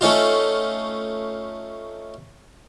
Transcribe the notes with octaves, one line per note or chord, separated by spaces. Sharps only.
A3 C#4 D#4 F4